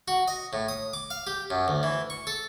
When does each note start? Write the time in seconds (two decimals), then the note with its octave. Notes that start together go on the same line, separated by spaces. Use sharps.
0.08 F#4
0.28 D#5
0.53 A2
0.68 D#6
0.93 D6
1.10 F5
1.27 G4
1.50 F#2
1.68 D2
1.83 E3
2.10 C#6
2.27 A4